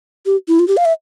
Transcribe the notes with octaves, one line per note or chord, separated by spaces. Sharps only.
G4
E4
F4
G4
F5
E5